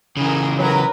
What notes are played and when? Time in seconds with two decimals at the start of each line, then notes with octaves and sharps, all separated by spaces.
0.17 C#3 E3 G#4 A#4
0.58 F#3 A#4 B4